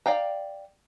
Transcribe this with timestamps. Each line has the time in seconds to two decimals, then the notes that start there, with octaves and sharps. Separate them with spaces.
0.06 D5 F5 G5 A#5